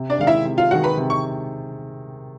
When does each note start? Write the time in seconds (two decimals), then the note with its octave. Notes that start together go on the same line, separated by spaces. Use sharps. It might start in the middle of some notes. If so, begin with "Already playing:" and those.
Already playing: C3
0.10 D4 D5
0.19 D#3 G#3 F5
0.27 E4 E5
0.45 C3
0.58 F4 F5
0.71 D#3 G#3 F#4 F#5
0.84 B4 B5
0.97 C3
1.10 C#6